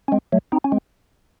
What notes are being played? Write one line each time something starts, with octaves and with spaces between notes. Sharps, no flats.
C#4
G#3 C4
F#3 A3
C4 D#4
C#4
G#3 C4